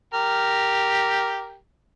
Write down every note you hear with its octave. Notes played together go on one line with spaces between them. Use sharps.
G4 A#4